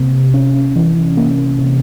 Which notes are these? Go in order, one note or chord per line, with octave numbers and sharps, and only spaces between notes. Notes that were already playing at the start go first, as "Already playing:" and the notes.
Already playing: C3 A#3
C#4
E3
A#3
C3